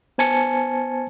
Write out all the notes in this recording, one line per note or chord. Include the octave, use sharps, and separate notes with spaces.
B3 C5 G#5 A5 C#7